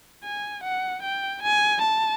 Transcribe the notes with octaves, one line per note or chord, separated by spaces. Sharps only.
G#5
F#5
G5
G#5
A5